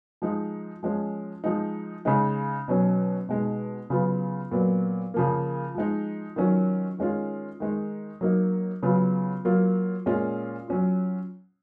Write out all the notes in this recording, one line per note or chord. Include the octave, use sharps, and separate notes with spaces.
F3 G#3 D#4
F3 G#3 C#4
F3 G#3 D#4
C#3 G#3 D#4
B2 F#3 C#4
B2 G#3 D#4
C#3 F#3 B3 F4
A#2 F#3 B3
C#3 F3 A#3
F3 G#3 D#4
D#3 F#3 C#4 F4
D#3 G#3 C#4 F4
D#3 G#3 D#4
F#3 A#3 D#4
C#3 F#3 B3 F4
F#3 A#3 F4
A#2 G#3 C#4 F4
F#3 C#4 F4